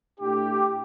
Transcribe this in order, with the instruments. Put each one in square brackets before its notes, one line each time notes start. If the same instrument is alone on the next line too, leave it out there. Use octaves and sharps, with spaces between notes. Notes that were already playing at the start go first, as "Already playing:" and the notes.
[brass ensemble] A2 A3 D4 G4